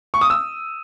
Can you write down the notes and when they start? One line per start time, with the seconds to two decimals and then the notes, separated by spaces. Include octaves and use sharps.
0.14 C#6
0.21 D#6
0.30 E6